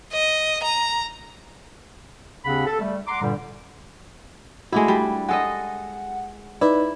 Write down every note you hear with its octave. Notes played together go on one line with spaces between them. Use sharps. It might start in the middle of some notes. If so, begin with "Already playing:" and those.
D#5
A#5
D#2 C#3 C4 D4 F#5 B5
A4
G3 A3
F#5 A#5 C6 D6
G2 A#2 D3 G3
G#3 A3 D4 E4 F#4
G3
G#3 A4 D#5 F#5
D#4 E4 B4 D5